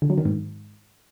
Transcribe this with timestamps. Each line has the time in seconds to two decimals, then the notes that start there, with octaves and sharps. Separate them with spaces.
0.02 D3
0.10 F#3
0.18 D#3
0.25 G#2